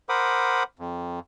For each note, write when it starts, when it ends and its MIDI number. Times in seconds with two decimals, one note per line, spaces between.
0.09 0.63 70
0.09 0.63 72
0.09 0.63 78
0.09 0.63 83
0.09 0.63 86
0.09 0.63 87
0.79 1.20 41